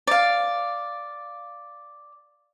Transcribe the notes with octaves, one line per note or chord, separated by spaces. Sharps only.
D5 F5